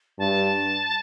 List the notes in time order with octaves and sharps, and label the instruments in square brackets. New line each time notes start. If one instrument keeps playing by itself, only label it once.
[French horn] G2 [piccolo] A5